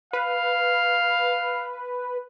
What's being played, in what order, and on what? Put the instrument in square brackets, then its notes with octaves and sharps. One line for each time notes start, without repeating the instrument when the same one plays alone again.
[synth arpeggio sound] B4 [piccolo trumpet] F5